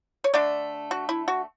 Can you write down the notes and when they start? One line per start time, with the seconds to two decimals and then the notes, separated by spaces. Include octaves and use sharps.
0.24 C#5
0.34 D3 A3 D4 D5
0.91 F#4
1.09 E4
1.28 F#4